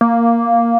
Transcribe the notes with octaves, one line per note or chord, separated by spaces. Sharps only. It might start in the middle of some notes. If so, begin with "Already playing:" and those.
A#3